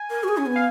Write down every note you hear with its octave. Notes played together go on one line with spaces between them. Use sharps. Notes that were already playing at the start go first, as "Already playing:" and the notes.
Already playing: G#5
A#4
F#4
G#4
C#4
B3
F5